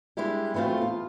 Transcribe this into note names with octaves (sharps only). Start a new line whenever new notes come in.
G3 G#3 D4 E4 G4
E3 F#3 A3 C4 F4
E2 F4